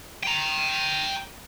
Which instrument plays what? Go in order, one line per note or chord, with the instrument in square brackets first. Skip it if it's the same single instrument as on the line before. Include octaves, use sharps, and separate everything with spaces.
[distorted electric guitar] G5 A#5